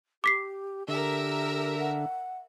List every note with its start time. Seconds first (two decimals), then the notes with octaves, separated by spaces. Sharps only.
0.24 G4 D6 B6 C7
0.88 D3 G4 A#4 E5
1.79 F#5